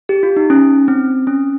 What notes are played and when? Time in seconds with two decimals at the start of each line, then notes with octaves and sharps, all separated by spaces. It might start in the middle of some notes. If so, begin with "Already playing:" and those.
0.09 G4
0.23 F4
0.37 D#4
0.50 C#4
0.88 C4
1.27 C#4